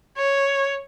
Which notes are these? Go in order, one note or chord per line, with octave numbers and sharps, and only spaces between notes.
C#5